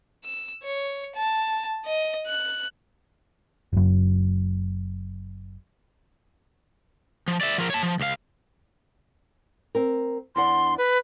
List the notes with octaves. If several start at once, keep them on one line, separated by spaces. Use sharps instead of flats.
E6
C#5
A5
D#5
F#6
F#1 F#2
F3
D5 E5
F3 A#4
C#5 A5
F3
C#2 F5
C4 A#4
E2 D4 F#5 C6
B4